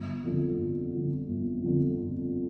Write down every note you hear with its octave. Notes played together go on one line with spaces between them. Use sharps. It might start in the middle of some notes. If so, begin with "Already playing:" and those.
Already playing: G1
F2 D3 F3
G1
F2 D3 F3
G1
F2 D3 F3
G1